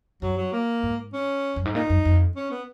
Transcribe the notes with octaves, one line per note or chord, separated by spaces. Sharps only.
F#2 F#3
F#3
A#3
G#2
C#4
F#2
G#2
A#2 D#4
F#2
F2
C#4
B3